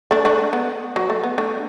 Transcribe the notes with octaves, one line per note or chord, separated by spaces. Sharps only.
A3 D4
A3 D4
B3
F#3
A3
B3
A3 D4